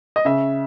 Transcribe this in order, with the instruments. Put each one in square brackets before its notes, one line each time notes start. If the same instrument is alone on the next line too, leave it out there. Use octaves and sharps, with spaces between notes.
[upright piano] D#5
C#3 E5